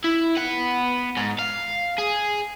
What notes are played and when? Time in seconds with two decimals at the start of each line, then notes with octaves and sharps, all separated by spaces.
0.04 E4
0.37 B3 F#5
1.17 G#2
1.39 F5
1.98 G#4